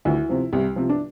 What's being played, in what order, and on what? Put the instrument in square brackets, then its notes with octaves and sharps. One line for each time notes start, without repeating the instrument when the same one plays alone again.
[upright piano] D2 E4
C3 F3
C2
C3 F3
D4